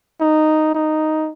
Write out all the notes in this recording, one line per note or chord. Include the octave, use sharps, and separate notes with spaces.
D#4
D#4